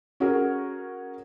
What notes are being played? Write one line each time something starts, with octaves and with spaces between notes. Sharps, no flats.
C#4 F#4 G#4 A#4